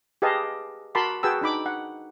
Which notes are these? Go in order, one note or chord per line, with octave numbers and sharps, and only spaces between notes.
G4 G#4 B4 D#5 F5 A5
F#4 A#4 A5 B5 C6 D6
F#4 G#4 B4 G5 A5 E6
D4 D#4 B5 D6
F#5